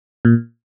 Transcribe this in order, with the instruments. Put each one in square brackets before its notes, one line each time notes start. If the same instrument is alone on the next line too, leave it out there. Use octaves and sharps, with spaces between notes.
[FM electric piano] A#2